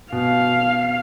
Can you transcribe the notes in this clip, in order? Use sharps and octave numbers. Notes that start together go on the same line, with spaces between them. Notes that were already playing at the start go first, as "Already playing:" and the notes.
B2 F5